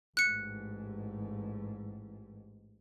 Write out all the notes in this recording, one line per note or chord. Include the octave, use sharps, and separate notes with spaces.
A1 G#2 F#6 C#7